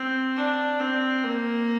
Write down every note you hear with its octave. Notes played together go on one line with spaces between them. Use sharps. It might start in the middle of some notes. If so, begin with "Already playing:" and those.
Already playing: C4
D4
C4
A#3